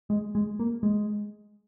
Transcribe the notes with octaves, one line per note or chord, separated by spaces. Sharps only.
G#3
G#3
A#3
G#3